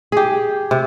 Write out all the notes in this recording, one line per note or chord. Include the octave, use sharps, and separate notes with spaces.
G4 G#4
C3